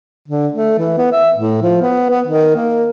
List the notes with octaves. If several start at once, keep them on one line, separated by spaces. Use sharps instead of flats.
D3
A3
E3
B3
E5
A2
F3
B3
B3
D#3
A#3